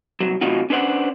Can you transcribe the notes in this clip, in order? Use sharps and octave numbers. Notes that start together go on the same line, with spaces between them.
C2 A#2 F#3
A2 C3 F#3 D#4 F4 F#4
C#4 D4 B4 C5 D#5 F#5